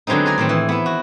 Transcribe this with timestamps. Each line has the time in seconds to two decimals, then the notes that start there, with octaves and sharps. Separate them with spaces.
0.07 D3 F#3 G#3 B3 C4 D#4
0.26 D5 D#5 G#5 A#5
0.38 A2 D#3 C4
0.49 E3
0.69 B3 E4
0.86 F#4